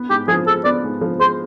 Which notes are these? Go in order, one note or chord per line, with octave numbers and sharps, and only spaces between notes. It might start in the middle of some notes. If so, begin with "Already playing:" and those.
Already playing: B3
G#2 G4
F3 G#4
G#3 A4
B3 D5
G#2
F3
G#3 C5